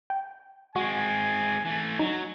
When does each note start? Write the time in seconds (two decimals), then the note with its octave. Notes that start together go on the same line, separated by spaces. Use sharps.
0.10 G5
0.76 G#3 C4 F#4 G#5
1.65 E3 A3 G#5
1.99 F#3 D#4